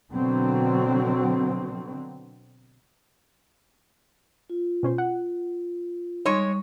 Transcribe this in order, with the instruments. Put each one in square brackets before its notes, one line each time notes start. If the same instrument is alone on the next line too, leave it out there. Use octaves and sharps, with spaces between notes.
[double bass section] B2 D3 F#3 C4
[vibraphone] F4
[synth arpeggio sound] B2 C#4 C5
F#5
[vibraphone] G3 C#6 [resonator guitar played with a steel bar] G#3 C#5 [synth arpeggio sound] D#4 C6 D#6